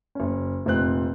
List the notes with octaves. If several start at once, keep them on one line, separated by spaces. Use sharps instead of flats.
F#1 C#4
F1 A#2 C4 F#6